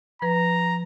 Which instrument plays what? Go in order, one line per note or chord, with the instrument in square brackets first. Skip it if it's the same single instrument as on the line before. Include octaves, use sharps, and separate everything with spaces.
[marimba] F3 B4 [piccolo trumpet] A#5